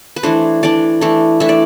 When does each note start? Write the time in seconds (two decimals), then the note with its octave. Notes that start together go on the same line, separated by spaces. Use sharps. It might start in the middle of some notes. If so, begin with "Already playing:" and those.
0.16 B4
0.23 E3 A3 D4 C5
0.63 E3 A3 D4 D5
1.01 E3 A3 D4
1.40 E3 A3 D4 E5
1.49 D5